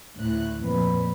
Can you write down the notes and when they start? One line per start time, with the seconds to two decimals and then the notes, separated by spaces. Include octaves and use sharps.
0.17 D2 A2 F#6
0.58 F2 A#2 B4